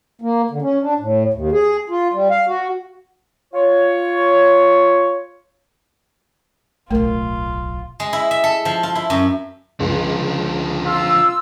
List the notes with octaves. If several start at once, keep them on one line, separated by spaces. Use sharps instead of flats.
A#3
D3
C#4
D4
A2
D#2
G#4
F4
G3
F5
F#4
F4 C#5
D1 B1 A3 F4 A#4
G#3
E4
E5
A4
F3
F4
E4
F#2
C#2 D3 F3
F4 E6